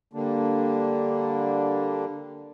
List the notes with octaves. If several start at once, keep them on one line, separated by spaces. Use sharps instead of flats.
D3 G3 A#3 D4